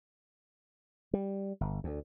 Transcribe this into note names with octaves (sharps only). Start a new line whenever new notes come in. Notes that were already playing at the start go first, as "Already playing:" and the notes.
G3
G1
D2